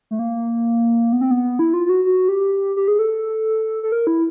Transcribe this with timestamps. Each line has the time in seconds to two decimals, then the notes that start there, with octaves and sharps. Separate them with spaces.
0.11 A3
0.19 A#3
1.13 B3
1.21 C4
1.31 B3
1.59 E4
1.74 F4
1.86 F4
1.89 F#4
2.05 F#4
2.28 G4
2.76 G4
2.88 G#4
2.99 A4
3.83 A4
3.92 A#4
4.07 E4